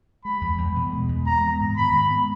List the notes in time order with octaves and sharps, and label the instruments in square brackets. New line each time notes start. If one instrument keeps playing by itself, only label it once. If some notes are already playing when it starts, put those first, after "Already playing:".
[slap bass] G#3 [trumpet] B5
[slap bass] E2
E2
B2
G#3
E2
[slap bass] G#3 [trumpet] A#5
[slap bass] B3
G#2
[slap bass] D#3 [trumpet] B5
[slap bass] G#3
B3